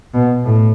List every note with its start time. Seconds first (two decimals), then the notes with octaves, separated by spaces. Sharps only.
0.14 B2
0.44 A2